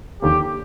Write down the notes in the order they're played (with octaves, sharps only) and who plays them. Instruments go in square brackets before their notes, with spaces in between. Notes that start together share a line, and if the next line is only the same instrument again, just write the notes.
[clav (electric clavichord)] D#2 D3 F3 A#3 C#4 [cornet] G4